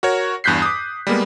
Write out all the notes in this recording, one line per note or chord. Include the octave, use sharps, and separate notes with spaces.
F#4 A#4 C#5
E2 G2 F#6 G6 B6 C7
D6 D#6
G3 G#3 A#3 B3